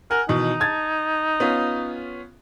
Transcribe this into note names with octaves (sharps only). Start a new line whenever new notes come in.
A#4 F#5 G#5
B2 D#3 E3 D#4
A5 G#6 A6
B3 C#4 F4